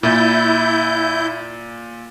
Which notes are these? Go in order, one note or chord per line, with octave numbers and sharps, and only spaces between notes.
A#2 E4 G6